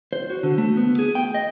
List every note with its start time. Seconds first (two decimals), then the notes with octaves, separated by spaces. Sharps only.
0.13 C5
0.30 F#4
0.43 D3
0.58 A3
0.77 B3
0.99 G#4
1.15 G5
1.35 D#5